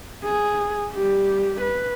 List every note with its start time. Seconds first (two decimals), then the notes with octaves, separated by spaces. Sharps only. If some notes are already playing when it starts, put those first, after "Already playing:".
0.23 G#4
0.92 G3 G4
1.61 B4